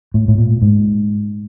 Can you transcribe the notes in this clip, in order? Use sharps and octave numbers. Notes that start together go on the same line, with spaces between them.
A2
A2
A#2
G#2